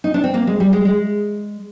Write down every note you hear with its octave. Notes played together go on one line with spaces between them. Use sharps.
D#4
D4
C4
A#3
G#3
G3
G#3
G#3